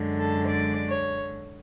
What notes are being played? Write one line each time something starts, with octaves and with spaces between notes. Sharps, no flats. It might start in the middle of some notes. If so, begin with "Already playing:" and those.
Already playing: F#2 D3 G#3
A4
D5
C#5